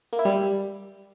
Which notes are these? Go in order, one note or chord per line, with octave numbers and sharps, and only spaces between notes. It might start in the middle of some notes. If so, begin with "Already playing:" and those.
A#3
E4
G3